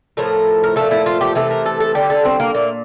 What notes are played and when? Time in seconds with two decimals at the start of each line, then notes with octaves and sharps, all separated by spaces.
0.17 A2 F3 A3 A#4
0.64 A#4
0.76 A#2 F3 A3 A4
0.91 E4
1.06 F4
1.21 G4
1.35 C3 E3 A3 A4
1.51 A#4
1.66 A4
1.80 A4
1.95 D3 G3 G4
2.10 A4
2.25 C4
2.40 A#3
2.54 A#2 A3 A#3